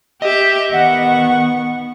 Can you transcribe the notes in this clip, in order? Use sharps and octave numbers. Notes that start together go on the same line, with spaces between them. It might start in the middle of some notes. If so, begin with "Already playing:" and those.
G4 D#5 E5
D#3 B3 F#5 C#6